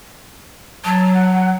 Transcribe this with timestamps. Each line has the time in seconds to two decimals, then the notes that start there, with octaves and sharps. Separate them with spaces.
0.85 F#3 A5
1.14 F#5